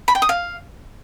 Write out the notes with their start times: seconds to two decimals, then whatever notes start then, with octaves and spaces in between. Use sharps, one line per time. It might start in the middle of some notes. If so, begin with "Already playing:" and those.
0.08 B5
0.15 G5
0.22 D#6
0.29 F5